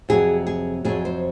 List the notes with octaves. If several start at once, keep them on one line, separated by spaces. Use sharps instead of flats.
F2 C3 F#3 G#4
G#4
F2 C3 F#3 G#4
C5